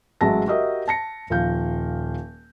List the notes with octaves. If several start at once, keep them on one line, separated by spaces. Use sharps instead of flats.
A1 F#3 G#3 E5 A5 A#6
F#4 G4 A#4 D#5 E5
A5 A#6 C#7
D#1 F3 F5 G6